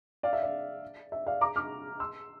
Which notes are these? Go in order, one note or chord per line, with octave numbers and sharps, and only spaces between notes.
D5 F5
E5
D5
E5
D5 F5
A#5 D6
D6 F6
C6 E6